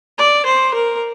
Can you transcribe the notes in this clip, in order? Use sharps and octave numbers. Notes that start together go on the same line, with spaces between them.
D5
C5
A#4